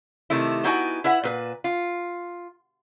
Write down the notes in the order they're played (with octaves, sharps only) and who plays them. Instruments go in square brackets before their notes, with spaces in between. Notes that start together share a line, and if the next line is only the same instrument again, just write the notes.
[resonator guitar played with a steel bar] C3 D#3 A3 E4
B3 D#4 E4 F#4 G5 G#5
E4 B4 E5 F#5
A#2 B4
F4